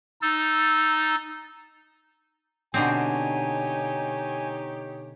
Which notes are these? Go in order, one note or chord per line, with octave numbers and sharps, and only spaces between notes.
D#4 E6 A6
B2 D3 C4 D#4 G4 C#5 G#5